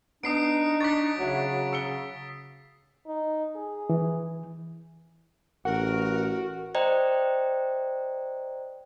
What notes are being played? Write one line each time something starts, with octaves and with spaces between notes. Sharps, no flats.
B3 D4 D#4 D#6 C7 D7
C#6 D6 F#6 A6 B6
C#3 F#3 F#4 C#5 E5
E6 C#7 G7
D#4
G#4
E3
A1 F#4 A#4 F#5
C5 D5 D#5 G5 A#5